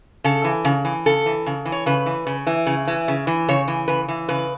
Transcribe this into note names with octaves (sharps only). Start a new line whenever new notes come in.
C#3 A4
E3
C#3
E3
C#3 A4
E3
C#3
E3
C#5
C#3 B4
E3
C#3
E3
C#3
E3
C#3
E3
C#3 C#5
E3
C#3 B4
E3
C#3 B4